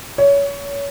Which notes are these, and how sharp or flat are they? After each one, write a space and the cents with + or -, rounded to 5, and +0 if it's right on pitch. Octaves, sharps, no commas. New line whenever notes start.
C#5 +25